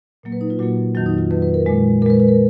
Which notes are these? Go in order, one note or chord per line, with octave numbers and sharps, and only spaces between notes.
A#2 F#3 A#3
B4
D#4
F4
A#2 F#3 A#3 F#4
F2 D#3 F#3 F#4
D#4
F4
F2 D#3 F#3 B4
B4
A#4
A#2 G#3
A#2 G#3 A#4 B4
B4
A#4